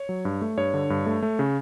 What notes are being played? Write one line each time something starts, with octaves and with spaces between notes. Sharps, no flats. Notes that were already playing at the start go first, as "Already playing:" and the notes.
Already playing: C#5
F#3
G2
A3
G2 C#5
D3
G2
A3
A3
C#3